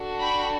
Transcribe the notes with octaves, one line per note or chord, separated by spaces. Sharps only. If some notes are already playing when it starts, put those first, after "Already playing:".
Already playing: D4 F#4 A4
G5 B5